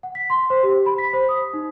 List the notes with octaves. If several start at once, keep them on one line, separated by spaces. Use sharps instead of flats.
F#5
B6
C6
C5
G4
B5
B6
C5
D#6
D#4